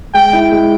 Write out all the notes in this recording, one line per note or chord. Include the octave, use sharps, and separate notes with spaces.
G#3 G5
E4
G#3